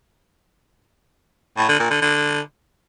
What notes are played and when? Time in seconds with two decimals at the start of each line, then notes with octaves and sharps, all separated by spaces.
1.57 A2
1.68 D3
1.79 A#2
1.90 D3
2.01 D3